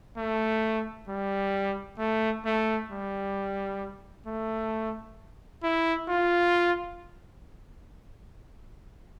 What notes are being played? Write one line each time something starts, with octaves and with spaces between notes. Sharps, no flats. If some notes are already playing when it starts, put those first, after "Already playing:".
A3
G3
A3
A3
G3
A3
E4
F4